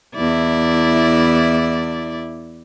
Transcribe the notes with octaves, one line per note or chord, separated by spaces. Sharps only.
E2 E4 D5